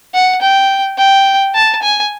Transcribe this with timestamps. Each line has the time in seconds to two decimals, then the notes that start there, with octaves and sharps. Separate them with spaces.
0.14 F#5
0.42 G5
0.98 G5
1.55 A5
1.82 G#5